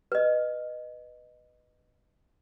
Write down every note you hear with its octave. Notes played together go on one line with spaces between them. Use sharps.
B4 D#5